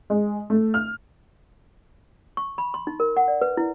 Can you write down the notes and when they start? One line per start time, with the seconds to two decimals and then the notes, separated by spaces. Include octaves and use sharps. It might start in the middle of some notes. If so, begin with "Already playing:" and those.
0.10 G#3
0.50 A3
0.74 F6
2.37 C#6
2.58 B5
2.74 C6
2.87 D#4
3.00 A#4
3.17 F#5
3.28 D5
3.41 B4
3.57 E4